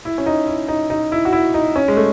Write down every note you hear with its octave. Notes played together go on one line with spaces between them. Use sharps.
E4
C#4
D#4
E4
D#4
D#4
E4
F#4
E4
D#4
C#4
G#3
A3